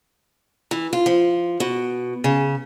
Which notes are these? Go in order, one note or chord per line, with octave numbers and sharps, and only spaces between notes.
E3
F4
F3
B2
C#3